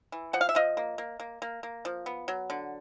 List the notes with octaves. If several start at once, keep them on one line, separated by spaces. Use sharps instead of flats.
E3
F3 F#5
F5
E5
F3 D#5 F5
A#3
A#3
A#3
A#3
A#3
F3
B3
F#3
D3